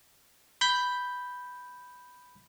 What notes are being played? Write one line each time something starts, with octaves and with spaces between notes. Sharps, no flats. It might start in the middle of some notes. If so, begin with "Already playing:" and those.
B5 G6 B6